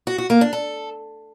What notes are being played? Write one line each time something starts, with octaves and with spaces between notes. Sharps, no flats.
F#4
F#4
A#3
D4
A4